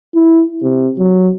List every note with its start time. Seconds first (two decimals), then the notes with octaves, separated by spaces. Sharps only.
0.15 E4
0.62 C3
0.98 F#3